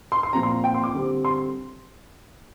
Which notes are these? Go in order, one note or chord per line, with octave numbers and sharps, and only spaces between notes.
C6
C6
A#2 F3 C4 A#5
C6
G5
C6
D6
D3 G3 C4
C6